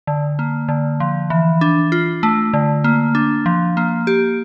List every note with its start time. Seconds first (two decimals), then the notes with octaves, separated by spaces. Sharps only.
0.07 D3
0.39 A#3
0.69 D3
1.00 F3
1.30 E3
1.61 D4
1.92 F4
2.23 A3
2.54 D3
2.84 A#3
3.15 D4
3.46 F3
3.77 A#3
4.07 G4